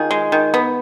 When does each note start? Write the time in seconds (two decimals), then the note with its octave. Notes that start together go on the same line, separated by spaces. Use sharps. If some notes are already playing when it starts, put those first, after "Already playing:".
Already playing: D#3 F4 G#4
0.11 G#3
0.32 D#3
0.54 B3